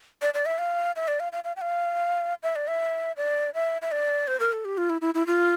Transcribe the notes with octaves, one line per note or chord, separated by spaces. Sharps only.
D5
D5
E5
F5
E5
D5
F5
F5
F5
G5
F5
E5
D5
E5
D5
E5
E5
D5
C5
A#4
A4
G4
F4
E4
E4
E4
F4